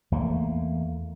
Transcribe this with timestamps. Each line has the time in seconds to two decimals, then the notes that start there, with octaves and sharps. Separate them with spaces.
0.12 E2 A3 A#3